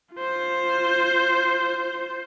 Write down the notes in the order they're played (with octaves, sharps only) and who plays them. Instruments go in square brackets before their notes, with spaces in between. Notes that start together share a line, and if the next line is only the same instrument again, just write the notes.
[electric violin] F4 C5